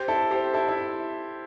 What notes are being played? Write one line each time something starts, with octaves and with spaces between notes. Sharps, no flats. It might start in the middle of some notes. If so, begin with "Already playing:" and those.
Already playing: G4 C5
E4 A4
G4 C5
E4 A4
E4